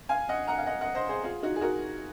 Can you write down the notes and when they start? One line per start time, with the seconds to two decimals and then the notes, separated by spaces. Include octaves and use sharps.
0.09 F5 G#5
0.29 D#5 F#5
0.47 F#5 A#5
0.58 F5
0.66 D#5 F#5
0.81 D#5 F#5
0.95 C5 D#5
1.09 G#4 C5
1.24 F4 G#4
1.43 D#4 F#4
1.56 G#4
1.61 F#4 A#4